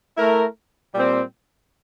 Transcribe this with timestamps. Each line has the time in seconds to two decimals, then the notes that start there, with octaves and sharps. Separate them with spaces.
0.17 A3 E4 A#4
0.94 A#2 G3 C4